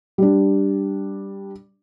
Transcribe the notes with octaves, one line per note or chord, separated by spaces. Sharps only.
G3 D4